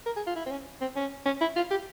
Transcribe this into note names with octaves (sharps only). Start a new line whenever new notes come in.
A#4
G#4
F4
E4
C4
C#4
C4
C#4
C#4
E4
F4
G4